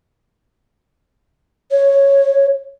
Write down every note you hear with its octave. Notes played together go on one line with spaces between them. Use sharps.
C#5